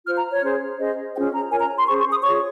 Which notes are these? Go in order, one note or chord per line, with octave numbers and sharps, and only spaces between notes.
F4 C5 F6
A#5
C#5
C#4 G#4 C5
C#4 G#4 C5 D#5
C#4 F4 G#4 C5 G5
A#5
F4 A#4 C#5 G#5
A#5
C6
C#4 G#4 C5 C#6
C#6
D#6
F4 G#4 C#5 C#6